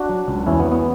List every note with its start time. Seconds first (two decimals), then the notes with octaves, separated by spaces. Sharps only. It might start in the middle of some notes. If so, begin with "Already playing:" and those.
Already playing: D4 F#4
0.09 F#3
0.28 C#2
0.47 E2 C#4 E4
0.60 B3
0.66 E2
0.72 B3